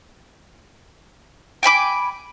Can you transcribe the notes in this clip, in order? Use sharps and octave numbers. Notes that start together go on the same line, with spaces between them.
G5 G#5 B5 D6